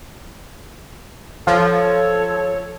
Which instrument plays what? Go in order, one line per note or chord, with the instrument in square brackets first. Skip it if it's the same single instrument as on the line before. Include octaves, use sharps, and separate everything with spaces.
[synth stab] F3 [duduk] A4 [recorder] C#5